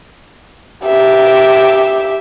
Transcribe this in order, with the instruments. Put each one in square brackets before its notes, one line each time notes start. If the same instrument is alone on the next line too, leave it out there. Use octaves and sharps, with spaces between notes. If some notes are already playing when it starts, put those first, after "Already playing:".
[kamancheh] G4 E5